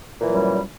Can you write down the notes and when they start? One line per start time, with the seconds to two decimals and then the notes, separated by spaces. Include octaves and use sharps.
0.20 A#2
0.23 E3
0.27 F#3
0.30 G3
0.33 F#2